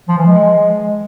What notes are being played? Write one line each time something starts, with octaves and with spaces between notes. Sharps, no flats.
F3
E3
G#3